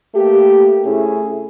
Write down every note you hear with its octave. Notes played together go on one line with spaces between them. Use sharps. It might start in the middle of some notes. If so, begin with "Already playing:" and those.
A3 A#3 G4
C3 A3 C#4 E4 G#4